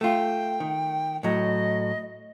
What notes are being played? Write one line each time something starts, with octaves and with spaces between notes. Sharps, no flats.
A3 F4 G5
D#3
A2 F#3 D#5